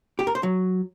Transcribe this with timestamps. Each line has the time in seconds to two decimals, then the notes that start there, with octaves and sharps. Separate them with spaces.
0.19 G4
0.27 A#4
0.35 C5
0.43 F#3